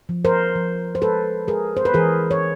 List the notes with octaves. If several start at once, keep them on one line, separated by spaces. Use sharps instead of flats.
F3
A#4 C5
F3
C5
G#3 A4 B4
G#3 G#4 A#4
C5
B4
E3 G#4 A#4
C#5